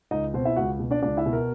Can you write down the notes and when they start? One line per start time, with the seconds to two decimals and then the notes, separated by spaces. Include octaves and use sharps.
0.11 C#2 D#4 D#5
0.34 B2 C4 C5
0.45 E4 E5
0.56 C#2 F#4 F#5
0.79 B2
0.91 D4 D5
1.02 C#2 D4 D5
1.17 E4 E5
1.26 B2
1.33 A#4